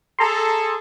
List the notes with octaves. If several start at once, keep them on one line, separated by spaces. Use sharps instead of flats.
G#4 A4 A5 A#5 C6